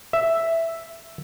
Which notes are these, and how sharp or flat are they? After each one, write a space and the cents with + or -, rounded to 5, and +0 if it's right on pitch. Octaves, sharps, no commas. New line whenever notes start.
E5 +0